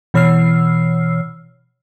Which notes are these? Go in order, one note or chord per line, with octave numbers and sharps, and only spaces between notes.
B2 E3 C#5 E6 F6 C7